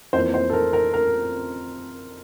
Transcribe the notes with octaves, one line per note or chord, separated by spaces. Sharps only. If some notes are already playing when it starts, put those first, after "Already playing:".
F2 E3 A#3 C5
C5
A4
A#4
A#4
A#4